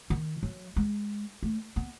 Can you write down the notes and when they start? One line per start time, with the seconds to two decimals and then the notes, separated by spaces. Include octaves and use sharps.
0.10 D#3
0.43 F#3
0.76 G#3
1.43 A3
1.76 B3